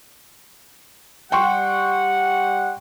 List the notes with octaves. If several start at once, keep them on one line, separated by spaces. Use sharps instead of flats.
G3 F#5 G5 C6 C#6